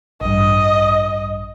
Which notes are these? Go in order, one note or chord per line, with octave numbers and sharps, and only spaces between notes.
A1 G2 D#5